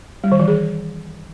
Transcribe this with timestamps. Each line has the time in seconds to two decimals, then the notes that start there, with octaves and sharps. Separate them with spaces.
0.24 G3
0.32 D#3
0.40 E3
0.48 G#4